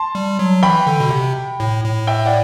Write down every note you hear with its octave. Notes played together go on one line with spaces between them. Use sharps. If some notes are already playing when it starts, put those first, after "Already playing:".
Already playing: A5 C6
G3
F#3
E3 G5 B5
D3
B2
C3
A2
A2
E5 G5
D5 F#5